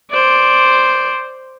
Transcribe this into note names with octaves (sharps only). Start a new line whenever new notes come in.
C5 D5